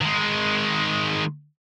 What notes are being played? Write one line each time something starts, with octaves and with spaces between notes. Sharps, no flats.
D#3 G#3